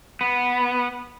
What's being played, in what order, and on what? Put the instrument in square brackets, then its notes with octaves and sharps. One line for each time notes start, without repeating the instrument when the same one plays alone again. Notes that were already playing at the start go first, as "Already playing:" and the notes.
[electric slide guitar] B3